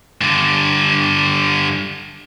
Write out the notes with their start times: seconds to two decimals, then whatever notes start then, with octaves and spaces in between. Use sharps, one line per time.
0.21 G2 D3